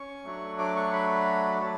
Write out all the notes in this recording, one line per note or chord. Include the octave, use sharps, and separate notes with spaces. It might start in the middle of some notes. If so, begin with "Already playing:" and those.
Already playing: C#4 C#6
F#3 A3 D4 F#4
D6
C#6
B5
F#3 A5